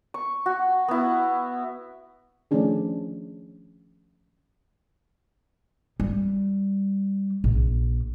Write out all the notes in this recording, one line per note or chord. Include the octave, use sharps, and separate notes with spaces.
C#6
F#4
B3 E4
D#3 F3 A3 C#4 D4 G#4
G3
A#1